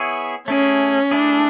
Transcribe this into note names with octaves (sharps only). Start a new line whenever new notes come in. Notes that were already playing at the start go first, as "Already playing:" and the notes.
Already playing: B3 E4 G#4 C#5
A3 C#4 E4 G#4
A3 D4 E4 G#4